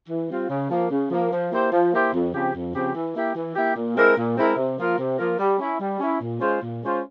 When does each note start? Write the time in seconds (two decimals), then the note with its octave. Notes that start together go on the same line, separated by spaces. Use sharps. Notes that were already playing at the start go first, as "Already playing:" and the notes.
0.09 E3
0.30 G3 C4 F4
0.49 C#3
0.70 F3 A#3
0.90 C#3
1.10 F3 A#3
1.31 F3
1.52 A#3 E4 G4 C5
1.72 F3
1.92 A#3 E4 G4 C5
2.12 F2
2.33 C#3 F3 C4 G4
2.54 F2
2.74 C#3 F3 C4 G4
2.95 E3
3.14 A#3 E4 G4
3.35 E3
3.55 A#3 E4 G4
3.75 A#2
3.96 G#3 C4 E4 A#4
4.17 A#2
4.36 G#3 C4 E4 A#4
4.57 C3
4.78 F3 A#3 F4 A#4
4.98 C3
5.19 F3 A#3 F4 A#4
5.39 G3
5.59 C#4 E4
5.80 G3
5.99 C#4 E4
6.20 A#2
6.40 G#3 C#4 F4 C5
6.61 A#2
6.82 G#3 C#4 F4 C5